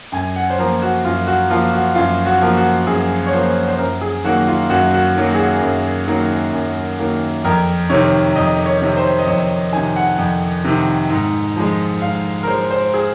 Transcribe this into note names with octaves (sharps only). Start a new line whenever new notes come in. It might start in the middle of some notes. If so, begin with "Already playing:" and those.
F#2 G#5
F#5
C5
F3 A#3 A#4
F#4
F#2 F4
F#4
F3 A#3 F4
F#4
F#2 F4
F#4
F3 A#3
F#4
F#2 G#4
C#5
F3 A#3 C5
C5
F#2 A#4
G#4
D#3 F#3 A#3 F#4
F4
F#2 F#4
F#4
D#3 F#3 A#3
G#4
F#4
F#2
D#3 F#3 A#3
F#2
D#3 F#3 A#3
F2 A#4
C3 D#3 C#5
F2 D#5
C#5
C3 D#3
C5
D#5
F2 C#5
D#5
C3 D#3 G#5
F#5
F2
C3 D#3
G#2
F3 G#3
G#2 F5
A#4
F3 G#3 C5
C5
G#4